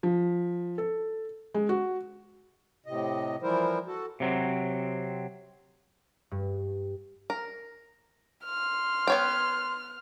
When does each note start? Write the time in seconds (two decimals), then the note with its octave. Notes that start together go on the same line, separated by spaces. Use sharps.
0.03 F3
0.78 A4
1.54 G#3
1.69 F#4
2.86 A2 C3 D#5
3.42 E3 F3 G3 E4 A#4 C5
3.86 F#4 A4
4.20 C3 F#3 C4
6.31 G2
7.30 A#4
8.45 C6 F6
9.07 B3 C#5 G5